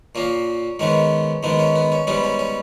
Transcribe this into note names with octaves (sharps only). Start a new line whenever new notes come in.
A#2 A#3 C#4
G#2 D#3 G#3 B3 C#4
G#2 D#3 G#3 B3
C#4
B3
C#4
G#2 G3 B3 C#4
C#4
C#4